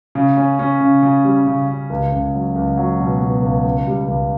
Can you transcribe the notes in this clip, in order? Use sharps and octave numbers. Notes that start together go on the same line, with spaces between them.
C#3
C#4
C#4
C#3
C#3
G3
C#3
C#3
C#2
C#2
F#3
C#2
F#3
B2
B2
C#2
C#2
G3
C#2